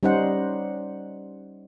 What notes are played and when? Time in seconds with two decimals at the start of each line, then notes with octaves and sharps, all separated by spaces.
0.03 G3 C#4 D#4 C5 F#5